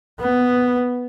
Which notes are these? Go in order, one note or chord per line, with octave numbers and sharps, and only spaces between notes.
B3